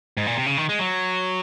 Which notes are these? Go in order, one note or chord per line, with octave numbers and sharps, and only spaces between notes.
G#2
A#2
C3
C#3
D#3
G#3
F#3